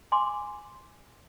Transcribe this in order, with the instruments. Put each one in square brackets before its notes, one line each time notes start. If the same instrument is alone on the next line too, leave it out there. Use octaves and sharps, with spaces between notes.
[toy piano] G#5 C6 D6